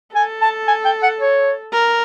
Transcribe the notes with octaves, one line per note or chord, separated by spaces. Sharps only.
A4 G#5
A5
G#5
G5
F#5
C#5
A#4